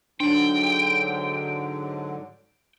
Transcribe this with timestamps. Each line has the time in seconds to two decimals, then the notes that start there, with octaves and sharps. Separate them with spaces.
0.20 G#2 D3 F#3 D4 G5